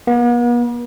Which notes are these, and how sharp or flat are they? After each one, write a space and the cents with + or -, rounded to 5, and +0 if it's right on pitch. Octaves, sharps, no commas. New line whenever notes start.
B3 -45